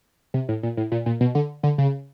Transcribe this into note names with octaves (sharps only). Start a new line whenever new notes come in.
C3
A2
A#2
A2
A#2
A#2
B2
D3
D3
C#3